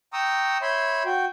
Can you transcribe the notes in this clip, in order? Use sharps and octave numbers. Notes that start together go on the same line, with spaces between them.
G5 A#5 C#6 D#6 E6
C#5 E5 B5 C6 G6
F#4 G5